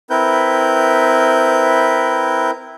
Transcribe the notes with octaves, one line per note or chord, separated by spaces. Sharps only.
C4 E4 A#4 B4 G6